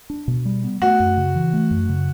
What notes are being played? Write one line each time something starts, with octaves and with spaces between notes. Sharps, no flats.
D4
B2
G3
B3
A3 F#4
F#2
C#3
E3
A3
F#2
C#3